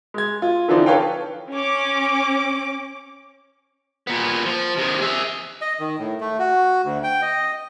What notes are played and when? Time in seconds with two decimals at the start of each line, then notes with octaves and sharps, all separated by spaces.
0.14 G#3 G#6
0.42 F4
0.68 D3 E3 F3 C4 D4 D#4
0.86 A4 B4 C#5 F5 G5
1.52 C#4 D6
4.07 A#2 B3
4.46 F3
4.77 C3 D#3
5.01 G#4 E5
5.61 D#5
5.80 D#3
5.99 A2
6.21 A3
6.39 F#4
6.84 D2
7.03 G5
7.22 D#5